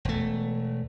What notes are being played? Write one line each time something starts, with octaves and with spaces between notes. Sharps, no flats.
E1 A3